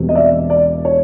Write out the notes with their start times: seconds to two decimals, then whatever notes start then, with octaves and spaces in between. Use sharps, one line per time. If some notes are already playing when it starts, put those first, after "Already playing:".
Already playing: E1 E2 B2 G3 C4
0.09 D#5
0.15 D5 E5
0.50 D5
0.85 C#5